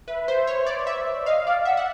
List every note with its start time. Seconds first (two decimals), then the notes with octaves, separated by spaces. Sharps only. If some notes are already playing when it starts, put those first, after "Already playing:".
0.08 B4 E5
0.28 C5
0.47 C#5
0.66 D5
0.87 E5
1.26 D#5 F5
1.46 D5 F5
1.65 E5 F#5
1.77 F#5